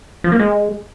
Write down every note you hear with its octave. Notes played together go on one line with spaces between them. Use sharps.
F3
A#3
G#3